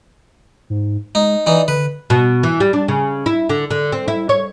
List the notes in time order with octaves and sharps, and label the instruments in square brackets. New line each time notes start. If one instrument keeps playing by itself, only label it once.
[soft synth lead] G#2
[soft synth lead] G#3 [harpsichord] D#4
[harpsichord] E3 D#4 [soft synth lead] D5
[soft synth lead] D3 [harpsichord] B4
[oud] B2
E3
G3
D4
C#3
E4
D3
D3
C4
E4
C#5